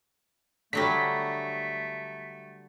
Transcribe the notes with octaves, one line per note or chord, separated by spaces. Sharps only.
D3 F#3 G3 A3 B6